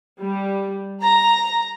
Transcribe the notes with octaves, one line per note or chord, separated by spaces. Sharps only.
G3
A#5